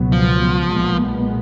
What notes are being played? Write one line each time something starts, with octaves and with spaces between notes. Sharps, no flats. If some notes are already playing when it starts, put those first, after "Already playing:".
Already playing: C#2 B2 F#3 B3
F3
B1 A#2 G#3 B3